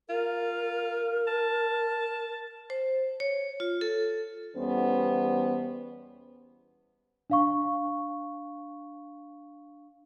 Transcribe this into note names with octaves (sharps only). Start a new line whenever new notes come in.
F4 A#4
A5
C5
C#5
F4
A4
E2 E3 G3 B3 C#4 C5
D4 F5 C#6